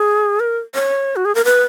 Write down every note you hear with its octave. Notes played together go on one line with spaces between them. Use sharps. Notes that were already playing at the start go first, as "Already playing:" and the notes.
Already playing: G#4
A#4
C#5
F#4
G#4
A#4
B4